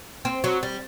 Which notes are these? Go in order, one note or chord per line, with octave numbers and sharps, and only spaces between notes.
C4
F#3
G3